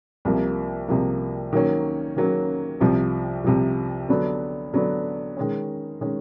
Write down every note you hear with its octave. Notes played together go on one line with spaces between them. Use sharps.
C2 C3 F3 A#3
C2 C3 F3 A#3
D#3 F#3 A#3 C#4
D#3 F#3 A#3 C#4
C2 C3 F3
C2 C3 F3
D3 F#3 B3 D4
D3 F#3 B3 D4
D#3 G#3 C#4
D#3 G#3 C#4